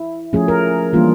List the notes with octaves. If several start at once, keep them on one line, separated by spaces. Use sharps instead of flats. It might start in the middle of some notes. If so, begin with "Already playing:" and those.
Already playing: E4
F3 A3 C#4 G#4
A#4
E3 G3 A#3 D4 F4